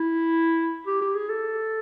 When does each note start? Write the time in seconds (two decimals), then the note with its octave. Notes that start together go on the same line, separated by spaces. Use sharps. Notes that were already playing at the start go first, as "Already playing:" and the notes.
Already playing: E4
0.87 G4
1.01 G4
1.15 G#4
1.29 A4